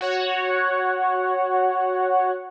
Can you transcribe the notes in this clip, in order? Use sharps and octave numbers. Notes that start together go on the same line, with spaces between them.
F#4 C#5 F#5